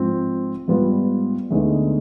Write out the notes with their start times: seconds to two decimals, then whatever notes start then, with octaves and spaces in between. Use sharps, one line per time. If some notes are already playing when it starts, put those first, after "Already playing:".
Already playing: G#2 F3 C4
0.68 G#2 G3 B3 F4
1.51 D2 D3 G#3 B3 D#4